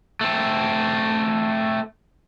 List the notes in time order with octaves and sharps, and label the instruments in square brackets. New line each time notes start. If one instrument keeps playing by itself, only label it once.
[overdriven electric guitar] A3 C4